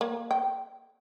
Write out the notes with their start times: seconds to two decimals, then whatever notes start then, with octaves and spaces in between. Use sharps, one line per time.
0.01 A#3
0.31 G5